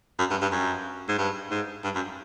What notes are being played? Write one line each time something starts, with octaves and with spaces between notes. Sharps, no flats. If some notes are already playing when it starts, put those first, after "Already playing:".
F#2
G2
G2
F#2
G#2
G2
G#2
G2
F#2